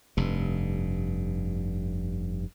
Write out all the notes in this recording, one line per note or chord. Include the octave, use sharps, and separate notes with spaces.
F1 G2